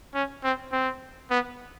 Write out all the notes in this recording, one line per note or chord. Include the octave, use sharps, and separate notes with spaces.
C#4
C4
C4
B3